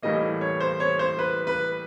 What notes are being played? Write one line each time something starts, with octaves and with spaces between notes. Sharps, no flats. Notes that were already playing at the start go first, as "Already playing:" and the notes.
A2 E3 G3 A#3 D#5
C#5
C5
C#5
C5
B4
B4